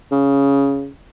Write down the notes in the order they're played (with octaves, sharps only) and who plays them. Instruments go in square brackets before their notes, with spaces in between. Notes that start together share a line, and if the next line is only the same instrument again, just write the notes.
[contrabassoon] C#3